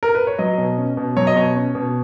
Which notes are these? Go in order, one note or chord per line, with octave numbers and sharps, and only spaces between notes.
A#4
B4
C#5
F#3 D#5
B2
C#4
B2
F#3 C#5
D#5
B2 C#5
C#4
B2